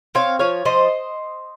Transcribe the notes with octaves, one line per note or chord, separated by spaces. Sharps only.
C4 C#5 F5
F3 C#5 F5
F3 C5 D#5